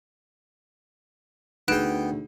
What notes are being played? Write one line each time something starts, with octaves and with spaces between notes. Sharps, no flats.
D2 B3 D#4 G#4 G5 F#6 D7 E7